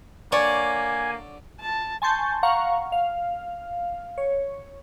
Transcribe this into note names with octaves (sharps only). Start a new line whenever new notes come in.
D3 A#3 C#5 D5 G#5
A5
G#5 A5 C6 C#6 G6 A6
F5 F#5 A#5 C#6
F5
C#5